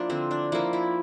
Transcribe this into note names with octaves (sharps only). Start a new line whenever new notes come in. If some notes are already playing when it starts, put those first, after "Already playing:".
Already playing: F3 A#3 D4 E4
D3 C4
D4
F3 A#3 E4
E4